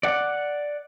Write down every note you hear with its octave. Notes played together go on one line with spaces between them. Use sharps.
D5 F#5